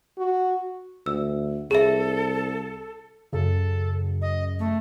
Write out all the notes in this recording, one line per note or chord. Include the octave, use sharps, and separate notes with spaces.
F#4
D2 E6
C2 G#4 A4 E5
F#2 C#3 A4
D#5
A3